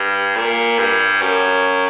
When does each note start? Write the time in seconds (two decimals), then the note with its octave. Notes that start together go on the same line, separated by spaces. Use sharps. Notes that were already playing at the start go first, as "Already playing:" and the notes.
Already playing: G2
0.36 A#2
0.79 G2
1.21 F#2